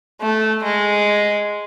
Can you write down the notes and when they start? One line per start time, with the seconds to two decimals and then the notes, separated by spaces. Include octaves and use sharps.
0.21 A3
0.63 G#3